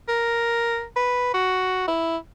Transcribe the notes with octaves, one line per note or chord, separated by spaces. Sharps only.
A#4
B4
F#4
E4